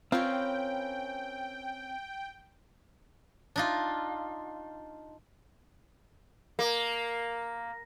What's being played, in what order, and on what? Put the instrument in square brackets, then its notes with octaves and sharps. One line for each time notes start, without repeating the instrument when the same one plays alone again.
[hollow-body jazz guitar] C4 [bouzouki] C#4 A#4 B4 [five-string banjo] F4 [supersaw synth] G5
[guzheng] D4 D#4 F4
[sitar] A#3